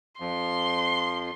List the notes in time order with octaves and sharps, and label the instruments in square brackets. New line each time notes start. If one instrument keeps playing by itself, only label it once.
[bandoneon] F2 F3 [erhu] C6